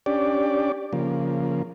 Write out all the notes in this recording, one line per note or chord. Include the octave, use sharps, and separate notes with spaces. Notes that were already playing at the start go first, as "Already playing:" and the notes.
C#4 D4 G4 D5
C#3 F3 A#3